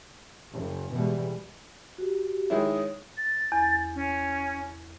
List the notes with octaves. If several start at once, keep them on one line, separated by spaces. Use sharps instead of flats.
F#1 F#2
B2 E3 G3 G#3
F#4 G4
D#3 G#3 E4 C#5 D#6
A6
E2
C#4